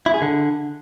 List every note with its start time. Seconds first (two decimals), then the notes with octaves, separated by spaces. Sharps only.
0.06 E4
0.14 G#4
0.22 D3